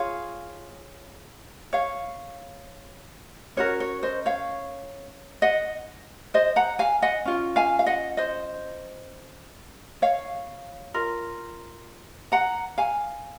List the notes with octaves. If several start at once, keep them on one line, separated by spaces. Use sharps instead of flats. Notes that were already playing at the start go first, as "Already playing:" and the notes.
Already playing: F4 G#4 C#5 F5
C#5 F5
C#4 F#4 A#4 C#5
C#5
C5 D#5
C#5 F5
D#5 F#5
C5 D#5
F#5 A#5
F5 G#5
D#5 F#5
C#4 F4
F5 G#5
F5
D#5 F#5
C5 D#5
C#5 F5
F4 A#4
F#5 A#5
F5 G#5